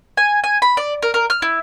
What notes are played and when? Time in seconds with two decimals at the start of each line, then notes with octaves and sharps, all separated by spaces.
0.17 G#5
0.44 G#5
0.62 B5
0.77 D5
1.02 A#4
1.14 A#4
1.30 F6
1.42 E4